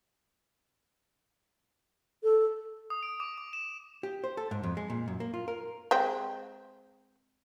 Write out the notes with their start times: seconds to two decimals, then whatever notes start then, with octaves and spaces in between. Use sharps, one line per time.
2.23 A4
2.90 D#6
3.03 D7
3.20 D6
3.38 D6
3.53 E7
4.03 G4
4.24 C5
4.37 A4
4.51 G#2
4.63 F2
4.77 G#3
4.90 A#2
5.08 F#2
5.20 A#3
5.34 F4
5.48 A#4
5.91 G#3 C4 G4